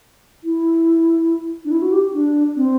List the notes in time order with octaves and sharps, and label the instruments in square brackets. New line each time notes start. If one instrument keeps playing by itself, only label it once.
[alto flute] E4
D4
E4
F#4
G4
D4
C4